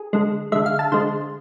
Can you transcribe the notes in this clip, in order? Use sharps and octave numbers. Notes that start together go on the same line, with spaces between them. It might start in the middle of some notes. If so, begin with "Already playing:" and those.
Already playing: G#4
D3 G#3
D3 G#3 E5
F5
A5
D3 G#3 C5